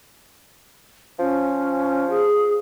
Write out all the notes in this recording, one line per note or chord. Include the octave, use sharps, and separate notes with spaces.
F3 C#4
G#4